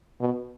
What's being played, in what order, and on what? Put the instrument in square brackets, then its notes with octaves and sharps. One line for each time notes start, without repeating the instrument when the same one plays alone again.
[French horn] B2